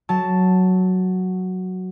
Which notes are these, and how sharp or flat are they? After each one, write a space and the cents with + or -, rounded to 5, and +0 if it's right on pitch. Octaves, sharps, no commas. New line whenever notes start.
F#3 +0 A5 +0